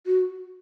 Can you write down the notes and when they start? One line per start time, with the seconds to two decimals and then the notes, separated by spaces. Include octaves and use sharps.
0.06 F#4